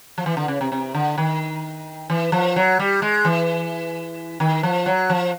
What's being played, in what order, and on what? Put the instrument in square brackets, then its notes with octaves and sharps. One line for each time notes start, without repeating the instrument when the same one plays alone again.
[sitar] F3
E3
D3
C#3
C3
C3
D3
D#3
E3
F3
F#3
G3
G#3
E3
D#3
F3
F#3
F3